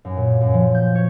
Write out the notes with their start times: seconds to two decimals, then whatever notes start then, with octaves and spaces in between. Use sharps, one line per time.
0.05 F#2
0.17 A#2
0.41 F#2
0.54 F3
0.74 G6
0.95 C#5